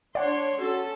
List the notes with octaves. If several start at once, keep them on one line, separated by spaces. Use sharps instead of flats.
D4 C#5 D5 F#5 C6
C#4 F#4 A4